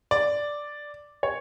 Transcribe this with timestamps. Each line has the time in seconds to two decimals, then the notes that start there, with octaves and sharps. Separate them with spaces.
0.11 D5
1.23 C#5